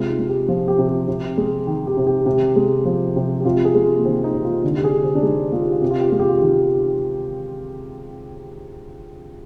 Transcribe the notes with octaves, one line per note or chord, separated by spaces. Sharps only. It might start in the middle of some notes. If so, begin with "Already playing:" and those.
Already playing: C3 G#3 F4
D#4
G#3
G4
F3 F4
G4
C3
G4
C3
G#3
D#3
G4
C3
G4
C3
G#3
F3
C3
G4
C3 F4
G#4
G#3
A#3
D#3 C4
D#4
C3
F4
D3
G4
G#4
D3
C4
D4
G#3 D#4
G#3 F4
G4
F4
C3 G4
F4
G4
G#3 F4
G4
F4
D#3 G4